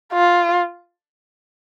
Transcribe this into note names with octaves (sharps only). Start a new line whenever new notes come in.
F4